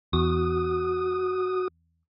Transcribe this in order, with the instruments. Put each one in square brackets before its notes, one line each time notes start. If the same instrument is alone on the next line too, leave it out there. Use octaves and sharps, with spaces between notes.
[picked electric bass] E2 [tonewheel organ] F#4 D#6